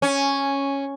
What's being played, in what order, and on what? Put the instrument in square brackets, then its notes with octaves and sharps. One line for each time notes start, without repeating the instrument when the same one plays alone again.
[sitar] C#4